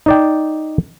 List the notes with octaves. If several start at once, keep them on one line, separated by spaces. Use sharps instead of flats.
D#4 D5 G5